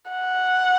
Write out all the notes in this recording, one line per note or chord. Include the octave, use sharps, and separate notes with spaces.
F#5